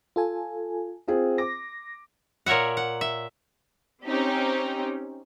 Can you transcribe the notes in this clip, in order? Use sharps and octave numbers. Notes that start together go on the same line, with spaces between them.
F4 A4 G#5
C4 F4 G#4
D6 A#6
A#2 A#4 C#5 E5 F#5
F#5
E5
C4 C#4 D#4 G4